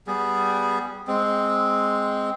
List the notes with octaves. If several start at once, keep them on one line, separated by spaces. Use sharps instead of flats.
G3 B3 G#4
G#3 C4